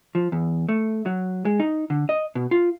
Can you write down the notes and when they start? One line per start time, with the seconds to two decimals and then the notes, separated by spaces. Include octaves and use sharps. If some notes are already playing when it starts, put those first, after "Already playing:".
0.15 F3
0.32 E2
0.69 A3
1.06 F#3
1.45 G#3
1.60 D#4
1.90 D3
2.09 D#5
2.35 B2
2.51 F4